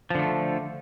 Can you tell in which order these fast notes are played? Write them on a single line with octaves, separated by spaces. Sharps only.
F3 D3 A3